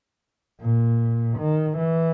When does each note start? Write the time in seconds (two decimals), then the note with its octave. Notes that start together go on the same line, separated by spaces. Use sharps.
0.61 A#2
1.38 D#3
1.78 E3